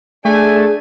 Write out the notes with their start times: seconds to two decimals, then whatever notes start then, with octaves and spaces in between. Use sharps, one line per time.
0.25 A3 D4 G#4 G#5